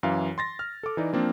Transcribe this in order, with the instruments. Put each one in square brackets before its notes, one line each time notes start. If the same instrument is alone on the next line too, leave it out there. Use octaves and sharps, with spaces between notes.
[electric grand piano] F#2 E3 F5
C6 A6 A#6
F6
A4 D6
E3 D#4 D5
F3 A#3 C4 D4